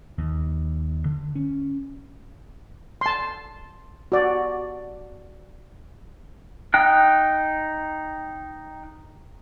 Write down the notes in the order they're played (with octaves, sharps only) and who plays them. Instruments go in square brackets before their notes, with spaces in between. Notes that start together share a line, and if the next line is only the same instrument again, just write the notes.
[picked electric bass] D#2
D3
C#4
[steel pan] A5 C6
F#4 D5
[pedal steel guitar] D#4 G5 F#6